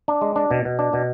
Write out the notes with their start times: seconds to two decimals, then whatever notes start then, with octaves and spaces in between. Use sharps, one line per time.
0.08 D4
0.21 G#3
0.36 D4
0.51 B2
0.65 B2
0.79 D4
0.93 B2